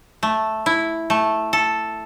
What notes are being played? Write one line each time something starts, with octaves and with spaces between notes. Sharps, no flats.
A3
E4
A3
A4